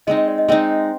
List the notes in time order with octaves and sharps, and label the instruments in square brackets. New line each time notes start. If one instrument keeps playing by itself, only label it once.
[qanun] G#3 C4 D#4 [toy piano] D#5
[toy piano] D#5
D5
D#5
[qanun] G#3 C4 D#4 [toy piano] D#5